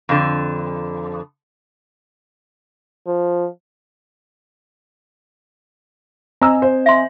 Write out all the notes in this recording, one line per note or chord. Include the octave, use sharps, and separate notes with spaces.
F2 D3
F3
C4 D#5 G#5 A#5 E6
C5
E5 C6